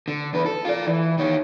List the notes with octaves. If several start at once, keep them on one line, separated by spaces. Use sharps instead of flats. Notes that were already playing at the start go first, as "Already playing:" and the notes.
D3
E2 B4
A4
F4 D5
E3
D#3 C#5